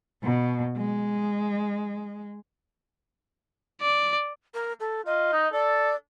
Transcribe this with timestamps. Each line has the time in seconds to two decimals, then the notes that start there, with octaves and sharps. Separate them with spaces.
0.23 B2
0.77 G#3
3.82 D5
4.54 A#4
4.80 A4
5.06 F4 D#5
5.33 D#4
5.53 A4 D5